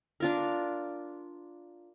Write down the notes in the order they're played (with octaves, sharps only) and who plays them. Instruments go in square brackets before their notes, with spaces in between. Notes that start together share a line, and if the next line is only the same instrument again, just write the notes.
[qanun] D4 F4 A#4